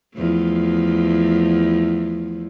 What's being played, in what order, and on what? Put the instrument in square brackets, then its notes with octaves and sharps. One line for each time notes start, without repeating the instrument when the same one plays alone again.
[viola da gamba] E2 F3 A3